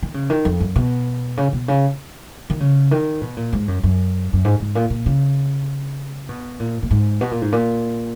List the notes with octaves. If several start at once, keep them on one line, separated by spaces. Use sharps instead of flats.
D#3
C#3
D#3
F2
F#2
B2
C#3
B2
C#3
D#3
C#3
D#3
B2
A#2
G#2
F#2
F#2
F#2
G#2
G#2
A#2
A#2
C#3
B2
A#2
A#2
G#2
B2
A#2
G#2
A#2